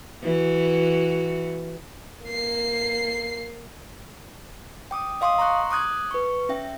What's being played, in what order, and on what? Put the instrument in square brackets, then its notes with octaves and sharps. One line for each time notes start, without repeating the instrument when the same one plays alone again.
[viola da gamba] E3 F#4
[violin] A#3 C7
[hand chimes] G5 D6 D#6
D#5 F5 C6 D6 D#6
A#5 C6 C#6 F#6
D6 D#6 F#6 G#6
B4 C#6
C#4 E5 G5